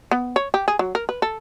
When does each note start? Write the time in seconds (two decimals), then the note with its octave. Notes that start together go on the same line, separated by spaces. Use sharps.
0.11 B3
0.36 C#5
0.54 G4
0.68 G#4
0.79 F#3
0.95 A#4
1.09 B4
1.22 A4